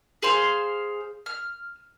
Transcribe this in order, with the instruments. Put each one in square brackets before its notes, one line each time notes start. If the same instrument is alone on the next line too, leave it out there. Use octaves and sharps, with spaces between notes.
[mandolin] G#4 C5 F5 C6
F6